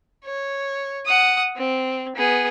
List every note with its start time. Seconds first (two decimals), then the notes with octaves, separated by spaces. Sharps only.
0.25 C#5
1.05 F#5 D#6
1.57 C4
2.16 B3 G#4